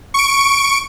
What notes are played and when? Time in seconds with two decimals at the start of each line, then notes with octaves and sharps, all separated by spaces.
0.14 C#6 D7